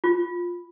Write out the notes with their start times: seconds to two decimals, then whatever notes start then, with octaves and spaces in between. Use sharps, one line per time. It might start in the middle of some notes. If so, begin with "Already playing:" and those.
0.04 F4